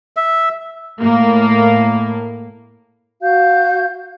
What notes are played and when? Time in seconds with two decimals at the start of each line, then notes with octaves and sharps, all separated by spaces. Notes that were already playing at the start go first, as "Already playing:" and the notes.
0.17 E5
0.99 A2 A#3
3.22 F#4 F5 G6